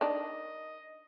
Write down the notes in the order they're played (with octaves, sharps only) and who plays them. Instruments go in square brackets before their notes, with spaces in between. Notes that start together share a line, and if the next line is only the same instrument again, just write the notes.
[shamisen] D#3 D4 [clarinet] D#5